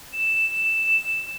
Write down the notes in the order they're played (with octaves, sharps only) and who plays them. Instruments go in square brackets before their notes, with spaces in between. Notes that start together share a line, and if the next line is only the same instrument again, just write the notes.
[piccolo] E7